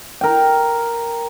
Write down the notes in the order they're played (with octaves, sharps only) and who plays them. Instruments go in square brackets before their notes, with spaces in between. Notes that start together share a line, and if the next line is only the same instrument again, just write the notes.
[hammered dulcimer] A#4 G5